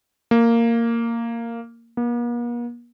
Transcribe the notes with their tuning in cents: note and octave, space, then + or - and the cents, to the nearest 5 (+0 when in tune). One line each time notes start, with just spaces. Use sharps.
A#3 -10
A#3 +45